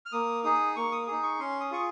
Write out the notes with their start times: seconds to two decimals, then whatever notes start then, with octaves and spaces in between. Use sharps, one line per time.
0.06 F6
0.12 A#3 D#6
0.44 D#4 G#4 D#6
0.76 A#3 C#6
0.92 D#6
1.07 D#4 G#4 D#6
1.23 C#6
1.40 C#4 C6
1.61 D#6
1.71 F4 G#4 C#6